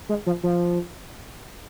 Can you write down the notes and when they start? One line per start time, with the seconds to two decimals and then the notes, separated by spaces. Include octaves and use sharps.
0.09 G#3
0.26 F3
0.43 F3